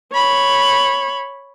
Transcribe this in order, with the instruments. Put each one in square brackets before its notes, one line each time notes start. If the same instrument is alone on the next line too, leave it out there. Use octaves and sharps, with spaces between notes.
[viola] C#5 B5